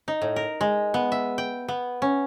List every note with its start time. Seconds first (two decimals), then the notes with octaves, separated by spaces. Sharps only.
0.08 D#4
0.22 A2
0.36 A#4
0.61 G#3
0.94 B3
1.12 E5
1.38 G5
1.68 B3
2.02 C#4